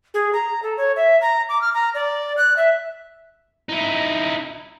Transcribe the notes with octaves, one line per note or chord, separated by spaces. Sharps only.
G#4
A#5
A4
C#5
E5
A#5
D6
F6
A#5
D5
F#6
E5
D#4 E4